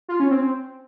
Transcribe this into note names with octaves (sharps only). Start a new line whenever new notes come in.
F4
C#4
C4